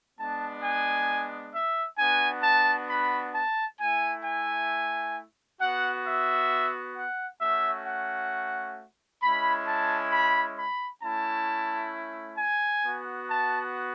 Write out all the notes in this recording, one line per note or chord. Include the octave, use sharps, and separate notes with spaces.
G#3 B3 D4 A5
G#5
E5
B3 D4 F#4 G#5
A5
B5
A5
A3 E4 G#5
G#5
B3 F#4 F#5
E5
F#5
A3 C#4 F#4 E5
F#5
G#3 C#4 E4 B5
A5
B5
B5
A3 C#4 E4 A5
G#5
B3 F#4
A5